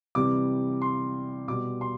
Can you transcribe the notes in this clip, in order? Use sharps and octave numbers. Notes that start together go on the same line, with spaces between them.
C3 E3 G3 D6
C6
B2 G3 D6
C6